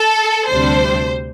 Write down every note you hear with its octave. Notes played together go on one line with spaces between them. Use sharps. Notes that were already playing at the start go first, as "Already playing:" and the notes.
Already playing: A4
D2 C3 G3 D4 C5